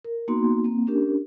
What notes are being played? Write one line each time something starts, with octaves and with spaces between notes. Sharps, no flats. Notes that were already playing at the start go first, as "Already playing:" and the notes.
A#4
A#3 B3 D#4 F#4 C6
A#3 C4
C#4 D4 G4 A#4